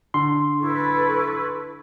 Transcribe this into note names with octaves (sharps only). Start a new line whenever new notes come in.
D3 C6
E4 A4 B4 C#6